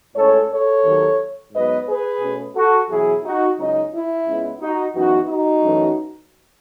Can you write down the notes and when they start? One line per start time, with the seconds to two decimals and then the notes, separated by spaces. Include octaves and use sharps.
0.16 A2 G#3 C#4 A4 C#5
0.50 A4 C#5
0.85 D#2 D#3 F#3
1.53 G#2 F#3 B3 B4 D#5
1.87 G#4 B4
2.21 B2 A3 C#4
2.56 F#4 A4
2.90 E2 B2 F#3 E4 G#4
3.24 D#4 F#4
3.59 C#2 C#3 F#3 C#4 D#4
3.92 E4
4.27 C#2 C#3 G#3 B3
4.61 D#4 F#4
4.95 F#2 E3 B3 D#4 F#4
5.29 D#4 F#4
5.64 F#2 E3 A3 C#4